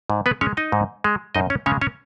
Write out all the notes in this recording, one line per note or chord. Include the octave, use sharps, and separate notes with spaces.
G#2
B3 B4
G#3 C#4 C#5
D#4 D#5
G#2
G#3
F#2 D#4 D#5
C#4 C#5
C#3 G#3 C#4 C#5
C#4 C#5